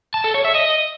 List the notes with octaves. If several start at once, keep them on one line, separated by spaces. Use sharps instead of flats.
A5
A4
C#5
E5
D#5